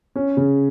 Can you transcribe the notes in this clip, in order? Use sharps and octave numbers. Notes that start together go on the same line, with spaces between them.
C#4
C#3